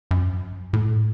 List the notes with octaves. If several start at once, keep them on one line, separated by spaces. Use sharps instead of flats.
F#2
A2